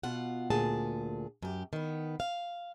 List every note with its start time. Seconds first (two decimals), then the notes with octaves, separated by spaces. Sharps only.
0.03 B2 F4 F#5
0.50 D2 A#2 G#4 A5
1.43 F#2 G4
1.73 D#3 B3
2.20 F5